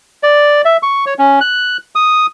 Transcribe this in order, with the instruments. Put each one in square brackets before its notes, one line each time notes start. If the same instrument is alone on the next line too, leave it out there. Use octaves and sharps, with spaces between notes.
[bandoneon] D5
E5
C#6
C#5
C#4
F#6
D#6